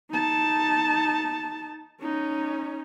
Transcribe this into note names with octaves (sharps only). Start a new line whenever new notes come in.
D#4 A5
C#4 D#4